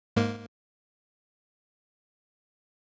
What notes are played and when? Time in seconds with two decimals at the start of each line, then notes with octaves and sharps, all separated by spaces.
0.16 G#2 A#3